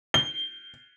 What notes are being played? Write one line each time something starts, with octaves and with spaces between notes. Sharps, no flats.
G7